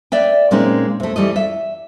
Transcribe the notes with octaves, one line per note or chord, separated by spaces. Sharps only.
B4 D5 E5 G5
A#2 G#3 C4 C#4 D#4
C3 A3
E3 G3 A3 D#5
E5